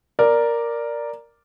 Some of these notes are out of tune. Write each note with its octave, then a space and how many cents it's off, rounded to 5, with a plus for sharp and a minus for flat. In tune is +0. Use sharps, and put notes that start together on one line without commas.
A#4 +0 D5 +0